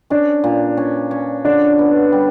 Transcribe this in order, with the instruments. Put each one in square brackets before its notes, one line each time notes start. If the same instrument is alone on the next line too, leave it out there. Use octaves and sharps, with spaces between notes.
[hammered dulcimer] C#4 [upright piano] D4
[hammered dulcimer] A#2
C#4
C#4
[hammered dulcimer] D3 [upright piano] D4
[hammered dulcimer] B3
G3